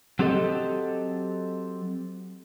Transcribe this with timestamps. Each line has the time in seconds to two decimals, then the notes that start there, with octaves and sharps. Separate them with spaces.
0.19 F#3 C4 G4 A4 D#5